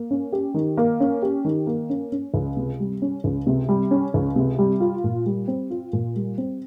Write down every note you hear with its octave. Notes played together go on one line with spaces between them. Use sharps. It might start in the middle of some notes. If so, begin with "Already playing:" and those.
Already playing: A#3
C#4
G4
D#3
A#3
C#4
G4
D#3
A#3
C#4
C#4
C#2
C3
G3
C#4
C#2
C3
G3
C#4
C#2
C3
G3
F4
A#2
G3
C4
F4
A#2
G3
C4